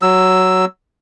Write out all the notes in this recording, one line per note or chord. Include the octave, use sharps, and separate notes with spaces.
F#3 E6